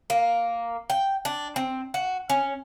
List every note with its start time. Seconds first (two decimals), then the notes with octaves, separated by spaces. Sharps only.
0.10 A#3
0.90 G5
1.25 D4
1.56 C4
1.94 F#4
2.30 C#4